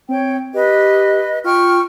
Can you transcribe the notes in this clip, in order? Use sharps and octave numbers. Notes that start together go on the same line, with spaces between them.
C4 C#5 G5
G4 B4 D#5
F4 G5 C#6 F6